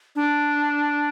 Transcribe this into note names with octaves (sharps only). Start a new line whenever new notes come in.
D4